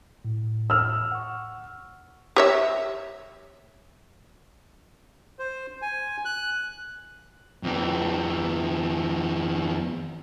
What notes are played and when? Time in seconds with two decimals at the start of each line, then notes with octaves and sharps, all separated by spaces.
0.25 A2
0.70 E6 F6
1.12 F#5 C#6
2.36 G4 C#5 E5
5.39 C5
5.82 G#5
6.25 F#6
7.63 F2 B3